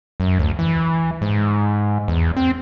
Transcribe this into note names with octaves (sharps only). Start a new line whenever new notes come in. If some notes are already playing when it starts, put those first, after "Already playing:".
F#2
D2
E3
G#2
E2
C4